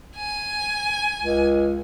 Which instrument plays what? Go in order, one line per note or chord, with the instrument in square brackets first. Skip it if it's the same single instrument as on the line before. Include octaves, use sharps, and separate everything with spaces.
[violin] G#5
[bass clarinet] C#2